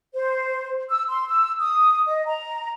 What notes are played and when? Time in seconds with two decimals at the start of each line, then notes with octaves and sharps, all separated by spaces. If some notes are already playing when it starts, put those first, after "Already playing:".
0.14 C5
0.90 E6
1.09 C6
1.28 E6
1.60 D#6
2.07 D#5
2.26 A#5